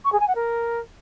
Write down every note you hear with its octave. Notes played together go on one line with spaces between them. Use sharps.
C#6
G#4
G#5
F#5
A#4